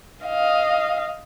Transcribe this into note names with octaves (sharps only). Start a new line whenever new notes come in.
D#5 F5